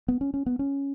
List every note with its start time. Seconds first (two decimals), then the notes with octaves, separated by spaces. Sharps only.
0.08 B3
0.21 C#4
0.34 C#4
0.46 B3
0.59 C#4